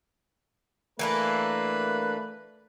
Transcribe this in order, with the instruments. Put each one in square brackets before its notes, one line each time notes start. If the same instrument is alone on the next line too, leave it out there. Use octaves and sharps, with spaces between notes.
[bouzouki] E3 A#3 D4 [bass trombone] A3 [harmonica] B4